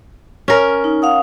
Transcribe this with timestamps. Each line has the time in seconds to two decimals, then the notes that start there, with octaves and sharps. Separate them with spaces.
0.48 C#4 A#4
0.84 D#4
1.02 F5 F#5 D#6